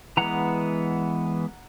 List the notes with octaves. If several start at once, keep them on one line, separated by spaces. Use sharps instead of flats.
E3 G#3 B3 F#5 A#5